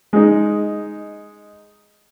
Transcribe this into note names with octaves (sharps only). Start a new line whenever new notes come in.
G#3 D#4